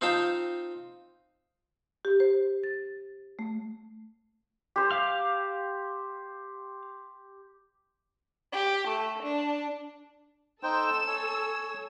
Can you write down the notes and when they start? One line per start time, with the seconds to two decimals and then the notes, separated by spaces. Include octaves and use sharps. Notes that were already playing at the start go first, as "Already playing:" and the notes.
0.01 C4 D#4 F4 G5 A5
2.05 G4
2.20 C5
2.64 A6
3.39 A3
4.76 G4 C5
4.91 F5 F6
8.54 G4
8.87 A3
9.23 D4
10.63 D#4 A4 C5 G5 E6
11.07 C#5 G#5